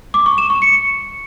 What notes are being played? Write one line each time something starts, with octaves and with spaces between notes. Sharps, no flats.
D6
C#6
E7
C#6
C#7